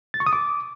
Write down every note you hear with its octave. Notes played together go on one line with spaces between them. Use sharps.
A6
C#6
D#6
D6